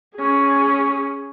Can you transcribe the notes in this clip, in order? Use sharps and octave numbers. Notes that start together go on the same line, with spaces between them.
C#4 G#4